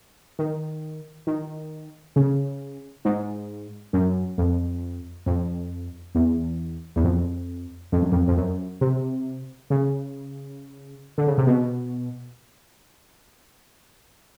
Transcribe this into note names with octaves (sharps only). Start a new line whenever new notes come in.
D#3
D#3
C#3
G#2
F#2
F2
F2
E2
E2
F2
F2
F#2
F2
F2
F#2
C3
C#3
D3
C#3
C3
B2